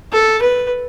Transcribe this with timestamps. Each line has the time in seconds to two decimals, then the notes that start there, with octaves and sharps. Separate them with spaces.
0.13 A4
0.42 B4